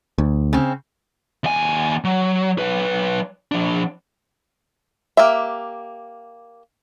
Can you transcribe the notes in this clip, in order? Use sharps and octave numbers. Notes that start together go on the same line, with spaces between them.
D2
C#3 C4
D#2 G#5
F#3
F#3 B4
F3 D4
A#3 G4 E5